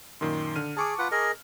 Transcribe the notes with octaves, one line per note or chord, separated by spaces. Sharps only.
F#2 A#2 D#3 C6
D3 F6 D#7
G#4 A5 C#6 D6
F4 B4 F#5
G#4 A#4 D#5